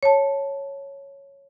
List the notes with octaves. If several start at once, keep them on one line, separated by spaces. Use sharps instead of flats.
C#5 A5